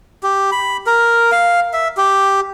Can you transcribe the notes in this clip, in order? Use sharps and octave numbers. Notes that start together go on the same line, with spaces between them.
G4
B5
A#4
F5
E5
G4